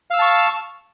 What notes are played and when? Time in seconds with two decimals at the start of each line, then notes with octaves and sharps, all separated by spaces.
0.11 F5
0.13 E6
0.16 F6
0.19 A5
0.22 C#6